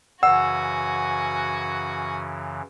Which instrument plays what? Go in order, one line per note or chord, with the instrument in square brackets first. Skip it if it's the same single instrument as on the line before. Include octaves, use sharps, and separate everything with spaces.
[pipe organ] F#2 C#3 E3 [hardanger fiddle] F#4 G#5 [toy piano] F#5 [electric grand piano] E6